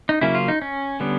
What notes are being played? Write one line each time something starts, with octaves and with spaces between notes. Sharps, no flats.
D#4
C#3 F#3 A#3 C#4 E4
F4
D#4
C#4
D3 G3 B3